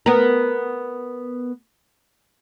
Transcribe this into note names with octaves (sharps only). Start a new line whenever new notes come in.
B3 A#4